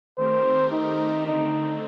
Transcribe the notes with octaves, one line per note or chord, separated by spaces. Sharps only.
D#3 A3 C4 G4 A#4 C5
D#4
D3 A3 C4 D#4